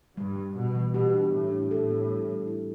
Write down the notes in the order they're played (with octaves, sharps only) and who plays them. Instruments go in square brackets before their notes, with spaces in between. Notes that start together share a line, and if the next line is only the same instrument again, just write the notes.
[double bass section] G2 [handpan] G3
[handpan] G3
[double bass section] B2 [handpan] G3
[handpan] E3
[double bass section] B2 [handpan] G4
[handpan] D4
[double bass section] A2 [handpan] E3
[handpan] D4
[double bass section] A2 [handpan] A4
[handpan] B3
G3
G3
E4